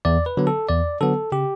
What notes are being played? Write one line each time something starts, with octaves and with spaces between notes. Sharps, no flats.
E2 D5
B4
D3 F#3 B3
A4
E2 D5
D3 F#3 B3 A4
C#3 G4